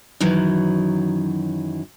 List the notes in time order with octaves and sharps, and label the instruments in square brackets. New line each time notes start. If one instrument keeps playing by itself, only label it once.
[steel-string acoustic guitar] F#2 D#3 E3 F#3